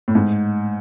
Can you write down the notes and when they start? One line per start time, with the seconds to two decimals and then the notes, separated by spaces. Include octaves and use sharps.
0.08 A2
0.15 G#2